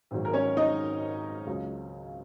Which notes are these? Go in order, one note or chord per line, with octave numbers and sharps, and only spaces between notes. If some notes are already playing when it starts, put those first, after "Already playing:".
G#1 G#2 D#3 F#3
A#4
C#4 C#5
D#4 D#5
C#2 C#3 F#3